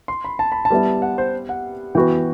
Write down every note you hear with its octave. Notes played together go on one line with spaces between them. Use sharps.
C6
B5
A5
B5
A5
G3 B3 E4 G4
F#5
C5
F#5
E3 B3 F#4 G5